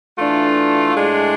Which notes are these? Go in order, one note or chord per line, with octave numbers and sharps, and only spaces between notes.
E3 A3 D4 F4
A2 G#3 D4